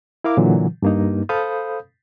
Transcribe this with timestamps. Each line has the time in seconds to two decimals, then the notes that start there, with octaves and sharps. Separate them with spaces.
0.24 E4 A#4 F5 D6
0.37 A#2 D3 E3 F#3
0.82 G2 A#3 D#4
1.29 A4 C5 F5 B5 D#6 G6